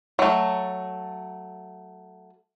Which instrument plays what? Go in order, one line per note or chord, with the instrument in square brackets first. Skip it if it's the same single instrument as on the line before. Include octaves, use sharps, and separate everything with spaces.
[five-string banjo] F#3 A3